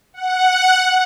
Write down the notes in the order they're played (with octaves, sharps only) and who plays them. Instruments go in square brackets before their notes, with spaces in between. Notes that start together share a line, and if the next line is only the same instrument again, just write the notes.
[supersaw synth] F#5